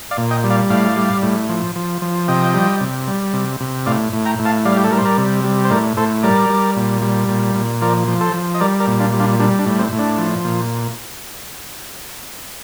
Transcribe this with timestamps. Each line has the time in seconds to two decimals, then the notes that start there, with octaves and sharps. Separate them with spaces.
0.11 D5 F5
0.17 A#2
0.31 D#5 G5
0.44 G3
0.50 D5 F5
0.70 A2 D5 F5
0.96 G3
1.22 A2
1.49 F3
1.76 F3
2.02 F3
2.28 C3 D#5 G5
2.54 G3
2.81 C3
3.07 G3
3.33 C3
3.60 C3
3.86 A2 D5 F5
4.13 A2
4.26 G5 A#5
4.39 A2
4.45 F5 A5
4.65 G3 D5 F5
4.77 G4
4.84 A4
4.91 G3 A#4
4.98 C5
5.05 A#4 D5
5.18 C3
5.44 G3
5.65 C5
5.70 A2 A#4 D5
5.97 A2 A4 C5
6.23 G3 A#4 D5
6.50 G3
6.76 A#2
7.02 G3
7.29 A#2
7.55 A#2
7.81 F3 A#4 D5
8.08 F3
8.21 A4 C5
8.34 F3
8.54 D#5
8.60 G3 A#4 D5
8.80 A#4 D5
8.87 A#2
9.00 D4 F4
9.13 G3
9.20 D4 F4
9.39 G3 D4
9.59 D4
9.66 A2
9.79 C4
9.92 A2
9.98 D4
10.18 F3
10.45 A#2